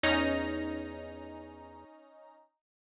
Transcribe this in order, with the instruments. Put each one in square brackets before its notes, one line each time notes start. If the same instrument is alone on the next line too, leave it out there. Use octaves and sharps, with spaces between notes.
[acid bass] E2 [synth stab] C#4 D#4 A#5